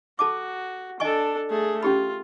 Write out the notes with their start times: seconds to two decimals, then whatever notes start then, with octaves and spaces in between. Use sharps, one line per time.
0.19 F#4 A4 A5 D6
1.00 D4 A4 D#5 G#5 C#6
1.50 A3 G#4
1.83 C#4 F4 G4 B5